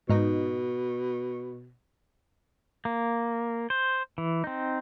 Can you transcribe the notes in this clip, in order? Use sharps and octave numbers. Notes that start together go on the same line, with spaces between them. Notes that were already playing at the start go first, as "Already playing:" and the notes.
G#2 B2 D#4
A#3
C5
E3
C4 D#4